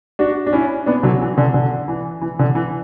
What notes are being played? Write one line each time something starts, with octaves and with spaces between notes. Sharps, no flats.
D4 F#4
D4
C#4 E4
B3 D4
D3 F#3
E3
D3
D3
E3
E3
D3
E3